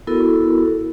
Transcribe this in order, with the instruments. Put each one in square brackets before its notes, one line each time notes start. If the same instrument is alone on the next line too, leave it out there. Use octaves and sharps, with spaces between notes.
[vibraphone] B3 E4 F#4 A4 A#4